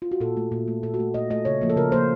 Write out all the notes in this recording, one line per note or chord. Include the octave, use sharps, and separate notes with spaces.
F4
F#4
A#2 A4
A3
A#2
A3
A#2 A4
F#4
A3
A#2 D#5
A3 D#5
C#3 C#5
F3 A#3
A4
C#3 A#4
F3 A#3 C5